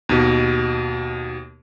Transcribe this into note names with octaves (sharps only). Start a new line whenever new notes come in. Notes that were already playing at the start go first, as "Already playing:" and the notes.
D#2 B2